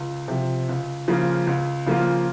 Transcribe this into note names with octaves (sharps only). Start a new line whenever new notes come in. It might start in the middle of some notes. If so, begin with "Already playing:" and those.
Already playing: C#2
C3 F3
C#2
C#3 F3 A#3 F4
C#2
C#3 F3 A#3 F4